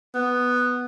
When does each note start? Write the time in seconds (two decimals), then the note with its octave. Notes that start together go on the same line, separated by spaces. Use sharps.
0.15 B3